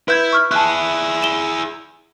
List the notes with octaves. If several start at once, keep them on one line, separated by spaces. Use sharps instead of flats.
E4 B4 G6 G#6
C#6 F6
E4 G#4 A5 F#6
E7 G7